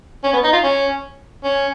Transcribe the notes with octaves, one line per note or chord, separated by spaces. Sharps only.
C#4
B3
D#4
F4
C#4
C#4